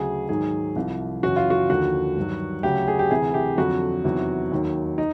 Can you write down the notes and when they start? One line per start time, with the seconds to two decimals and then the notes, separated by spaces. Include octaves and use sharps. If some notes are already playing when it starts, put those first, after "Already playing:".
Already playing: D2 C#3 F#3 G#4
0.29 G#2 D#3 F#3 G#4
0.76 C2 C3 F3
1.23 F#2 C#3 E3 F#4
1.36 F4
1.50 F#4
1.70 D#2 D3 F3 F#4
2.17 G2 D#3 F#3
2.63 D2 C#3 F#3 G4
2.88 G#4
2.99 G4
3.10 D2 C3 E3 G#4
3.34 G4
3.58 F2 D3 F#3 F#4
4.04 E2 C3 D#3 F#3
4.52 D#2 D#3 F#3
4.98 D#4